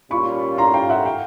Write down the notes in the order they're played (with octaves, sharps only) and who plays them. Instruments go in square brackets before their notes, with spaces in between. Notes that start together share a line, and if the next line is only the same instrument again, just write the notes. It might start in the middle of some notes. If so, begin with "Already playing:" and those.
[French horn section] A#2 G3 A#3 C#4 F4 [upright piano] B5 C#6
[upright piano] A#5 C6
F5 G5
E5 F#5
F5 G5